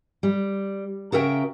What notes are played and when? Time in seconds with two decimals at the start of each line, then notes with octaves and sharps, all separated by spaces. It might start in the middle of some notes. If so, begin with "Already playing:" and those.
0.23 G3
1.12 C#3 F#4 A#4 E5 G5